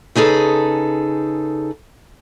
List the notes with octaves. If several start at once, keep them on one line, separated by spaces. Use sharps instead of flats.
C#3 D#4 G#4 A4 B4